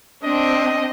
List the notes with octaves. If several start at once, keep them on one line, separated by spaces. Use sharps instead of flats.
C4 D4 D#5